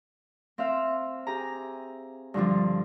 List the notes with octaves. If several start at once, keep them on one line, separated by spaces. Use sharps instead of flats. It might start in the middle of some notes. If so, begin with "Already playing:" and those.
C4 E5 F5
G4 G#4 A#5
G2 D3 F3 G3